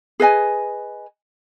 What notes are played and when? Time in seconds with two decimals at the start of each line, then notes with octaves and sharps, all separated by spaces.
0.20 G#4 B4 D#5 G#5